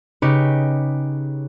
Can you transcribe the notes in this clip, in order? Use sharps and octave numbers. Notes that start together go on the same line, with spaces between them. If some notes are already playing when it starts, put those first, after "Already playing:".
C#3 D#4 G4 B4 C#5